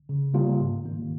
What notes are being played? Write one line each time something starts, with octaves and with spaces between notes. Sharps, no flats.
C#3
G3 A#3 F4
G#2
D#3 A#3